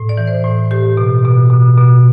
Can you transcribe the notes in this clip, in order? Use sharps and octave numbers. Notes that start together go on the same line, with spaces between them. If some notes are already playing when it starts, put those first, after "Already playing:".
Already playing: A2
D5
E3
C5
A2
A2 G4
B2
B2
B2
B2